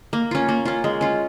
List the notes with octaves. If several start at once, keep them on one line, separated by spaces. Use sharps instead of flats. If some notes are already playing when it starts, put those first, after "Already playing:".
A#3
C#4 F4
A#3
C#4 F4
G#3
C#4 F4